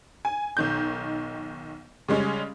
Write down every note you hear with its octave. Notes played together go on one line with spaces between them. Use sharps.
G#5
B1 D#3 G6
C#3 G3 G#3 C#4